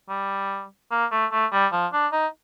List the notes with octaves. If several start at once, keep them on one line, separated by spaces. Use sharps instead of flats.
G3
A#3
A3
A3
G3
F3
D4
D#4